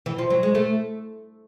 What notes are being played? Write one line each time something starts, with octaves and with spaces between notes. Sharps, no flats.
E3
F3
F#3
G#3
A3